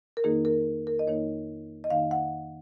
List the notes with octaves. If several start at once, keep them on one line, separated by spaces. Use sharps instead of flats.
A#4
F2 D#3 A#3 D#4 G#4
A#4
A#4
D#5
F2 D#3 A#3 D#4 C#5
D#5
F2 D#3 A#3 D#4 F5
F#5